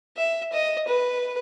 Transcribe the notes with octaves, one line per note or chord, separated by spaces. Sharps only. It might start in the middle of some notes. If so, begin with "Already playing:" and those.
E5
D#5
B4